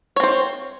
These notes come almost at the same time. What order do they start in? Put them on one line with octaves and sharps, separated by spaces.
C#5 C4 C5